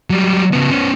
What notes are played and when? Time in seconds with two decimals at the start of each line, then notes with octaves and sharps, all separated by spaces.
0.10 F#3 G3
0.53 C#3 B3
0.71 B3 C#4